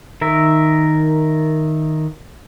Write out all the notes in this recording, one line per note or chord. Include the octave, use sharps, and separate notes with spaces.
D#3 A#4 E5